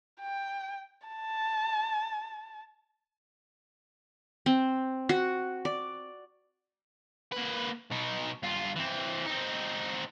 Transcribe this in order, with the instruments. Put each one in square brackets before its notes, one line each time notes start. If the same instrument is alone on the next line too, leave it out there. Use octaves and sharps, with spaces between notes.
[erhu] G5
A5
[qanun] C4
F#4
D5
[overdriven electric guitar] A#3 B4
B2 D#4
G2 F4
E3 C4
C4 D#4